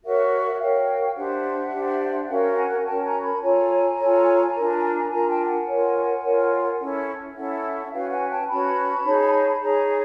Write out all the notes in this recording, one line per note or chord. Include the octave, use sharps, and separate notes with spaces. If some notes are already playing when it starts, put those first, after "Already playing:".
F#4 A#4 C#5 E5 F#5
F#4 A#4 C#5 F5 G5
D4 G4 C5 E5 F#5
D4 G4 C5
C#4 F#4 A#4 F5 G5
F#5 G#5
G5
G#5
C#4 F#4 A#4 G5 A5
G#5 A#5
A5 B5
F4 A4 C#5 G#5 A#5
F4 A4 C#5
D4 F4 A#4
D4 F4 A#4 G#5 A#5
G5 A5
F#5 G#5
F4 A#4 C#5
F4 A#4 C#5
C#4 E4 A4
C#4 E4 A4 E5 F#5
C#4 F#4 B4 F5 G5
F#5 G#5
G5 A5
C#4 F#4 B4 A5 B5
D#4 G#4 C#5
D#4 G#4 C#5 G#5 A#5